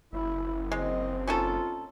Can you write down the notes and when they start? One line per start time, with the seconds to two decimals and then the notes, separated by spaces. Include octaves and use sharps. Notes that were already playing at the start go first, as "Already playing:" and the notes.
0.13 F#1 E4
0.72 G#3 C4 D#5
1.27 C#4 D#4 F4 A4